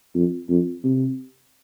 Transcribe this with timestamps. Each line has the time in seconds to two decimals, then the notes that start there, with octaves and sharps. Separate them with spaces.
0.15 F2
0.49 F2
0.84 C3